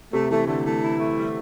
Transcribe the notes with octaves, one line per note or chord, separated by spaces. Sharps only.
C3 A3
E3 A3
D3 A3
E3 A3
E4
A3
G3